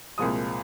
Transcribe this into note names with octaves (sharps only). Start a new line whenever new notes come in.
C2 A#2 F3 G#3 D#6